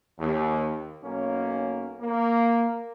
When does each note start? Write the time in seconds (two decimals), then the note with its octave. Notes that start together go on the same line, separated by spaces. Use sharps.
0.17 D#2
1.03 B1 A#3 C#4
2.01 A#3